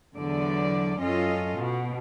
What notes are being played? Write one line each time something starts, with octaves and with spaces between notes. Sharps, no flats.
E2 D3 F#3 D5
F#2 C#4 F4 A4 D#5
B2